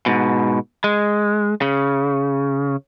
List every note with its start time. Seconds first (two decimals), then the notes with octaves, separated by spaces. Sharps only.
0.06 G#2 B2
0.84 G#3
1.62 C#3